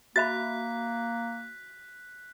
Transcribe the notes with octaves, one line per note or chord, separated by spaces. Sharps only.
A#3 F#4 E5 B5 F#6 A6 B6